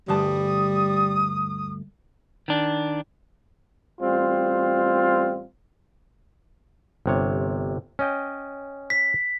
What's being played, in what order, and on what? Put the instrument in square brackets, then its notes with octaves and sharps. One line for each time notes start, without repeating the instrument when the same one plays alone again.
[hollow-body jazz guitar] D2 G2 A5 [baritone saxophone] G3 [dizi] D#6
[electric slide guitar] D#3 D4
[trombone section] A1 G3 C4 F4
[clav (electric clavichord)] G1 C3 C#5
C#4 D#5 G5
[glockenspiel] B6